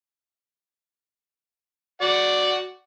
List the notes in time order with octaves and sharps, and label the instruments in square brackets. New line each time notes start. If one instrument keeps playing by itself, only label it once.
[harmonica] F#4 D5 F#5